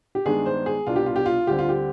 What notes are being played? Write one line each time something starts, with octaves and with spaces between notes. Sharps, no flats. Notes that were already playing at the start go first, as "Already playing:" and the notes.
G4
G2 D#3 G#3 B3 D4 G#4
C5
G#4
C2 B2 B3 D4 F4
G4
F4
G4
F4
D2 D3 G3 C4 G4
F4
G4